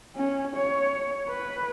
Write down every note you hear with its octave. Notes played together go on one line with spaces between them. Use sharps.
C#4
C#5
B4